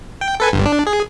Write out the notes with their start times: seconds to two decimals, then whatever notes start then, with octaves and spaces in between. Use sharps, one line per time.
0.21 G5
0.40 A4 B4 G#5
0.53 G1 G2
0.66 D4
0.87 G#4